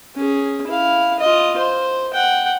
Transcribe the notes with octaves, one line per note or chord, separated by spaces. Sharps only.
C#4 G#4
E4 F5
F4 D#5
C5
F#5 G5